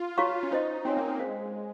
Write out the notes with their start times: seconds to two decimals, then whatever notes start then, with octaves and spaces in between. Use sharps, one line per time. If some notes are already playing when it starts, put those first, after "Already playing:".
Already playing: F4
0.18 F#4 C#5 F5 A#5 C#6
0.43 C#4
0.51 D#4 F4 C5 D#5
0.85 C4 C#4 F#4 C#5 G#5
0.97 A#3
1.08 A#3
1.19 G#3 C5 F5